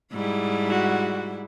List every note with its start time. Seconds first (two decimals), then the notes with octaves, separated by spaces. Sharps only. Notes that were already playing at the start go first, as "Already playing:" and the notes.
0.12 G#2 G3 E4
0.69 F#4